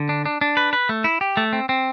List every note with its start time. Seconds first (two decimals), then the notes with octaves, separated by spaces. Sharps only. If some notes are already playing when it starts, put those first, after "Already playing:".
Already playing: D3
0.09 D4
0.26 D4
0.41 D4
0.57 B4
0.73 B4
0.89 A3
1.04 E4
1.21 G4
1.37 A3
1.53 C4
1.69 C4